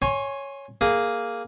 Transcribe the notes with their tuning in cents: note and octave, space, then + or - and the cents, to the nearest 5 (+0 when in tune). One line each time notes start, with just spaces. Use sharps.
C#5 +0 G#5 +0 C6 +30
A#3 +0 G#4 +0